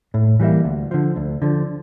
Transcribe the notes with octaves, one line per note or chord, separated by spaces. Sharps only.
A2
E3 G3 A#3 E4
D2
D3 F3
D2
D3 F3